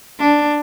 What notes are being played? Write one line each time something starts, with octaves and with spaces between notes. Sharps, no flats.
D4